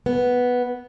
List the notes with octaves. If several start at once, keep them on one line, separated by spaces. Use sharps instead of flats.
B3